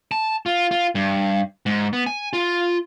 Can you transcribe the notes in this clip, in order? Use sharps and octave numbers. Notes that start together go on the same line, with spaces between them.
A5
F4
F4
G2
G#2
B3
G#5
F4